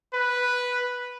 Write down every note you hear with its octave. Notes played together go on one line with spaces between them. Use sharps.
B4